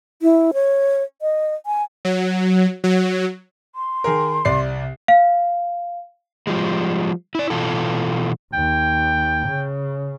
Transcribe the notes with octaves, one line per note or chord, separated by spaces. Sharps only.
E4
C#5
D#5
G#5
F#3
F#3
C6
D#3 G#4 A#4
C2 D5 C7
F5
F3 G3 G#3
E4 D5
B2 E3 F4 A4
D#2 G5
C#3